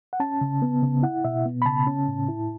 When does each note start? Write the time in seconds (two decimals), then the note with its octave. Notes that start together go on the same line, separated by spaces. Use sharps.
0.13 F#5
0.20 C#4 A5
0.41 C#3
0.62 B3
0.82 C#3
1.03 E4 F#5
1.24 B2 E5
1.46 B3
1.62 B5
1.66 C#3 A5
1.87 C#4
2.08 A2
2.28 E4